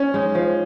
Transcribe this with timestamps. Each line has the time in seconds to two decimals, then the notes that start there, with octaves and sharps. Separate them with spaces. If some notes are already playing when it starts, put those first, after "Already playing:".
Already playing: C#4
0.14 G#3 D#4
0.35 F3